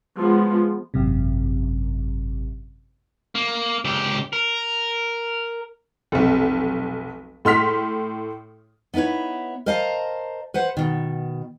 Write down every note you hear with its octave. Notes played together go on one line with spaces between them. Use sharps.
F3 G#3 B3
G#1 F#2 C3
A#3
C#2 G4
A#4
F1 B1
A2 C6 F6 B6
B3 D#4 E4 B4 C#5
A#4 C5 D#5 F5 A5 A#5
B4 C5 F#5
B2 D#3